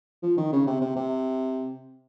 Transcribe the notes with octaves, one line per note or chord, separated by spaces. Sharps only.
F3
D#3
C#3
C3
C3
C3